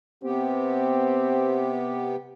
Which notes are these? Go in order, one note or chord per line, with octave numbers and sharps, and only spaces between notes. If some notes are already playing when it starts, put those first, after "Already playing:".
C3 B3 C4 G4